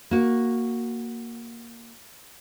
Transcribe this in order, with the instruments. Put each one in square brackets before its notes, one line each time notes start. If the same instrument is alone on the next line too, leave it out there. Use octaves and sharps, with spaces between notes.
[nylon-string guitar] A#3 F#4